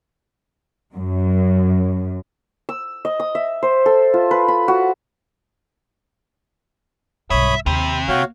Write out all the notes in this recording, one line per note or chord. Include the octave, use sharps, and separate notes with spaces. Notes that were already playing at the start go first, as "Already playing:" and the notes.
F#2
E6
D#5
D#6
E5
C5
A4
F4
B4
B5
F#4
B1 G2 C#5 E5 B5 D#6
D#2 C3 B5
A#3 F#4 C#5 F5